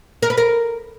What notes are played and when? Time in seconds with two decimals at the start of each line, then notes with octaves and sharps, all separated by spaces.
0.22 A#4
0.30 B4
0.37 A#4